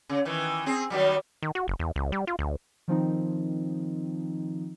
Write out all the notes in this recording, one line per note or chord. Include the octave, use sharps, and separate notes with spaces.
C#3
D#3 E3
C4 G#4
D#3 F#3 G3
D#3
F#4
F#1
E2
C#2
G3
F4
D2
D#3 F3 C4 D#4